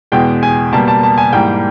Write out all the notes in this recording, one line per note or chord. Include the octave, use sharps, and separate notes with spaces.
E2 B2 G#3 G5
G#5
B2 G3 A#3 A5
A5
A5
G#5
G#2 E3 G3 A#3 G5